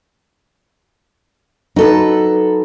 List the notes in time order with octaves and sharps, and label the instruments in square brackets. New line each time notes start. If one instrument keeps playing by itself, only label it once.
[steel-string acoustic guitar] F#3 A4 B4 [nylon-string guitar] D#4